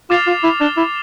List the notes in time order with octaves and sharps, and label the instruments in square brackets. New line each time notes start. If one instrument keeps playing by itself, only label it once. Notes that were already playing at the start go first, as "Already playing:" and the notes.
[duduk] F4 [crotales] D6 F6 A6 C7 F7
[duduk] F4
E4
[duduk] D4 [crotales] F6 A6 E7 G7
[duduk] E4